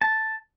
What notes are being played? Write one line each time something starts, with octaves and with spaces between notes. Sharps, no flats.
A5